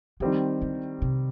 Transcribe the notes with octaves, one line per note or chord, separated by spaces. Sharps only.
D#3 F3 G3 C4 G4
D3
C3